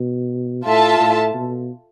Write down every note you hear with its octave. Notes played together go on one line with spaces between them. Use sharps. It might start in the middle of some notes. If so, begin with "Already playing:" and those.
Already playing: B2
A2 F4 A4 E5 A5
A2
B2